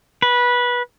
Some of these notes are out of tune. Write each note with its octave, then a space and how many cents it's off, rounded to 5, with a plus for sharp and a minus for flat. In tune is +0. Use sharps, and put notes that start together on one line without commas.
B4 -20